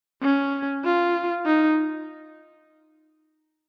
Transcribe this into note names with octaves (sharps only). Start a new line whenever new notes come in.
C#4
F4
D#4